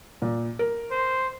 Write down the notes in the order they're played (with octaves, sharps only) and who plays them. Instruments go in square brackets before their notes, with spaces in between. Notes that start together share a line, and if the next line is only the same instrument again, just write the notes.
[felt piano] A#2
A#4
[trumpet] C5